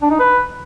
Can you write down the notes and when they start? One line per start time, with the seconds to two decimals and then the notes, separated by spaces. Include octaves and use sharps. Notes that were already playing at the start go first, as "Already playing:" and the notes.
0.02 D4
0.11 D#4
0.19 B4